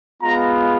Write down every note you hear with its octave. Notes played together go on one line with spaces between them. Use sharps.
G#3 B3 F4 A#5